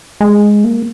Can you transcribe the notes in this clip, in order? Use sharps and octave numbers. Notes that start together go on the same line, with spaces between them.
G#3
A#3